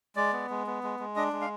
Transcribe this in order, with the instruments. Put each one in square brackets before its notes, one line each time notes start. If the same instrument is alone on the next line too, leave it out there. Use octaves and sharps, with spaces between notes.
[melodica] G#3 D5
B3
G#3
B3
G#3
G#3
D4 D#5
G#3
F5